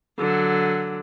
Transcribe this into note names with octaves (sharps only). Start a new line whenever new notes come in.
D3 F#3